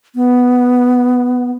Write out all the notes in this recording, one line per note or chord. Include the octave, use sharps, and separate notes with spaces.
B3